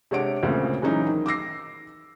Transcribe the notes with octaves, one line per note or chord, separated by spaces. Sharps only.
C3 G#3 D4 C#5 F#5 D7
D2 A#2 C#3 G#3 C4
E3 F#3 G#3 C#4 D#4
D#3
D6 E6 A#6 C7